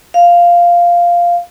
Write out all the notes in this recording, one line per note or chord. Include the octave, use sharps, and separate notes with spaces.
F5